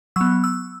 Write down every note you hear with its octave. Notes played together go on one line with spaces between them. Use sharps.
F#3 B3 E6
E6